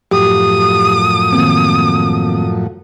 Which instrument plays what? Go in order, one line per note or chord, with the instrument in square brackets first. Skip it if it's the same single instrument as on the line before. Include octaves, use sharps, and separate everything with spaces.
[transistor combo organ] F#2 A2 F3 [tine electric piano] G4 [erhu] D#6
[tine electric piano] D#3 A#3 C4